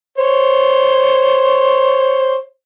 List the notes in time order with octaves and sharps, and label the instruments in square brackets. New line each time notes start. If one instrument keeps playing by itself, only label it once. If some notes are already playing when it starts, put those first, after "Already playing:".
[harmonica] C5 C#5